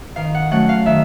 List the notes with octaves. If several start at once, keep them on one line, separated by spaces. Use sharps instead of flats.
D#3 F5
F#5
F#3 A3 C#4 F#5
F5
D#3 E5